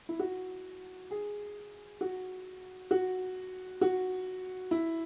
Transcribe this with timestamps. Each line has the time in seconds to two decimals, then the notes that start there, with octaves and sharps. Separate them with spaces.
0.09 E4
0.19 F#4
1.11 G#4
2.01 F#4
2.91 F#4
3.81 F#4
4.71 E4